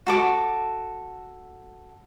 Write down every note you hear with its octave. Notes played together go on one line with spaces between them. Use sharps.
F#4 A4 D6